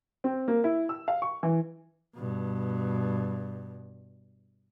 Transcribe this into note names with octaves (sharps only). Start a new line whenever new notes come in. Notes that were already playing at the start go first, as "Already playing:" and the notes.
C4
A#3
E4
E6
F5
C#6
E3
G2 B2